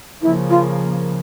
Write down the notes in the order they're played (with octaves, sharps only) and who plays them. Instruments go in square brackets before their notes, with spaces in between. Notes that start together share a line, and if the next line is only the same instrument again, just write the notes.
[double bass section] C#3 F3 A#3 [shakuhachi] E4
[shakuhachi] F4